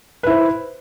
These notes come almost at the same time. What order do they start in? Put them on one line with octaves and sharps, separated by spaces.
B4 E4 C5